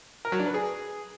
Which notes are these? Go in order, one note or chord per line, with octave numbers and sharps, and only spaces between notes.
A#4
F#3
D4
B4
G#4